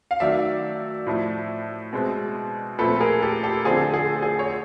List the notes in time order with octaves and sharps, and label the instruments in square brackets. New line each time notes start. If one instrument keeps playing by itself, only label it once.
[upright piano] F5
D#3 F#3 A3 D5 E5
A2 F3 A3
B2 G#3 C4
A#2 F3 A3 C4 A4 B4
G#4 A#4
G4 A4
G4 A4
D3 F3 A3 C4 G#4
A4
G#4
G#4
C#5